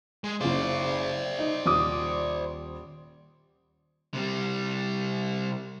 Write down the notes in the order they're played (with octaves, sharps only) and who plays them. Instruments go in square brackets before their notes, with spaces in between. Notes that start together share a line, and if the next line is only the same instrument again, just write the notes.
[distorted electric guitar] G#3
[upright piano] F#1 C#3 [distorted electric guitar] C5 D5
[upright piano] D#4
D#1 D6 D#6
[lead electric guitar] C3 G3